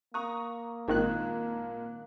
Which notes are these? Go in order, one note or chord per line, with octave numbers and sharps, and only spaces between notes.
A#3 A#5 C#6 D#6
G#1 A#2 D#3 D4 F#6